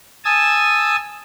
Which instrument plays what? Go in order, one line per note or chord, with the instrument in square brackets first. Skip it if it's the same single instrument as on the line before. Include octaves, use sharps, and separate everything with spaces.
[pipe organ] G#5 A5 D#6 E6